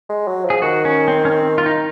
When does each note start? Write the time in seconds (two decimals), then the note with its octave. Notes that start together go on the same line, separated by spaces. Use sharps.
0.10 G#3
0.28 F#3
0.45 F3
0.50 G#4
0.62 D#3 F#4
0.85 C#4
1.08 C4
1.25 C#4
1.32 C4
1.58 F4
1.66 D#4